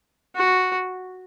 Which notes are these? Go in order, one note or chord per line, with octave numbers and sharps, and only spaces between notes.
F#4